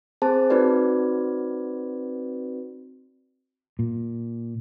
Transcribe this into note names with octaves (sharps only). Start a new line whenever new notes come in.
C4 G#4 C5 A5
C4 D#4 F#4 B4 D5
A#2